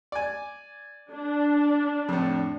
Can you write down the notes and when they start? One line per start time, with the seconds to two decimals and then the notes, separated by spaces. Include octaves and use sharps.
0.12 D5 G#5
1.11 D4
2.09 F2 A2